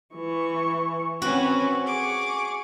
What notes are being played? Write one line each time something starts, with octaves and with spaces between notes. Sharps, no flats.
E3 C#6
C4 C#4 F#4 B4
G#4 C#6 D6